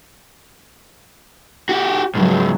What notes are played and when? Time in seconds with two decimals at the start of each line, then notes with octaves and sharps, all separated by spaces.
1.69 F#4 G4
2.15 C#2 G#2 F#3